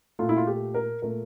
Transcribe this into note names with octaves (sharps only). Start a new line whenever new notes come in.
A#2 A3 F4
E4
F4
G4
A#4
A#2 A3 A#4